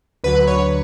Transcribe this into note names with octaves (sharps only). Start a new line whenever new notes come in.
D2 D3 F#3 B4
C#5